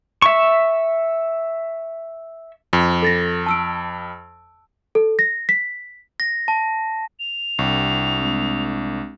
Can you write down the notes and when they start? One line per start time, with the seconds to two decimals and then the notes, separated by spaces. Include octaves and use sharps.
0.22 E5 C#6
2.73 F2
3.02 A4 A6 A#6
3.46 A5 E6 D7
4.95 A4
5.19 A#6
5.49 B6
6.20 A#6
6.48 A5
7.19 F7
7.59 C2 D4 G5 E6
8.18 G#3 C4 D4